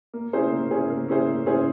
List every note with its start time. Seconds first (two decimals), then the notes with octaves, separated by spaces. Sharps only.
0.14 A#3
0.33 C#4 E4 G#4 C5
0.52 A#3
0.71 C#4 E4 G#4 C5
0.90 A#3
1.08 C#4 E4 G#4 C5
1.28 A#3
1.46 C#4 E4 G#4 C5